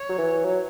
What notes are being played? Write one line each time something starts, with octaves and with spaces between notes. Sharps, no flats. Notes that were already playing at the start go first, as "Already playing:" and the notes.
Already playing: C#5
F#3
E3
F#3